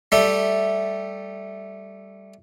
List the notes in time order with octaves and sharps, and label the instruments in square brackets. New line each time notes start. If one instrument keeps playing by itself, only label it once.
[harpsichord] G3 A3 G4 E5